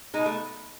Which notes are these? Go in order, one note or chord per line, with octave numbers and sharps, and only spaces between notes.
B2 G#3 D#4
A3